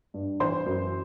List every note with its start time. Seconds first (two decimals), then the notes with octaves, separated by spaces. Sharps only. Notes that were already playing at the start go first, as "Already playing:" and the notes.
0.14 G2
0.40 E3 C5 C6
0.66 F#2